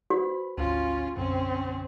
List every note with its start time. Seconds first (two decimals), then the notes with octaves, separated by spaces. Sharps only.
0.10 F#4 B4 C5 B5
0.57 G#1 D2 C#4 F4
1.16 B1 F#2 D3 C4 C#4